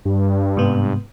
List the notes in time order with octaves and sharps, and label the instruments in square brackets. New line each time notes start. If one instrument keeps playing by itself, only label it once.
[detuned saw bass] G2
[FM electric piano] G#2 C3 B3